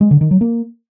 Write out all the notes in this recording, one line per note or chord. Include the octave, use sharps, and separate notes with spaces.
G#3
D3
D#3
F#3
A#3